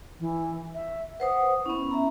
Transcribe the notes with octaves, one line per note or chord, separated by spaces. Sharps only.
E3
E5
B4 C5 F#5 D#6
B3 C#4 E4
E5 A#5